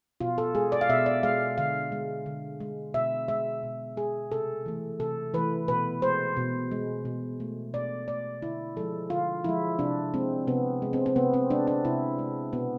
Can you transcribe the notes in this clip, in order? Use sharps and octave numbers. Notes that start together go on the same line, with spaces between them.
B2 F4
A4
G#3 G#4
D5
F5
B2 E5
D5
G#3 F5
D3 F5
G#3
D3
G#3
B2 E5
G#3 E5
B2
G#3 G#4
C3 A4
E3 A3
C3 A4
E3 A3 B4
B2 B4
G#3 C5
B2
G#3
B2
A3
B2 D5
A3 D5
D3 E4
F3 G#3 A4
D3 F4
F3 G#3 E4
C3 D4
G#3 C4
C3 B3
G#3
C4
C4
C3 B3
C4
G#3 D4
D4
C3 E4
G#3
B2 B3